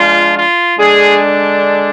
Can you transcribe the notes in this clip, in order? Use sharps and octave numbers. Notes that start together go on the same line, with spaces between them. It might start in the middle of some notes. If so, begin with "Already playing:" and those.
Already playing: F3 G#3 D4 F4
F4
D3 G#3 D4 G#4